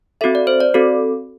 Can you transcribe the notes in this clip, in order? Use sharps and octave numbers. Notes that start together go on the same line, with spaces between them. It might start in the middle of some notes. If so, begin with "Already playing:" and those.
C4 F#4 A4 E5
D5
C5
D5
C4 F#4 A4